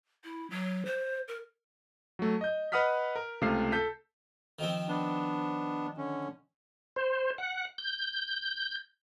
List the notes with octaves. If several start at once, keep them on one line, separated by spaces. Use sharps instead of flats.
E4
F#3
C5
A#4
F#3 A3
D#5 G6
B4 D#5 F#5 D#6 F6 B6
A#4
C#2 C3 A3 F5 C7
A4 G6 B6
D#3 F3 C4
B3 D4
D3 C#4
C5
F#5
G6